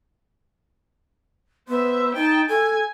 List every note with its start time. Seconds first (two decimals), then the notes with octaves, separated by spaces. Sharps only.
1.68 B3 C5 E5
2.15 D#4 G5 A5
2.49 A4 G#5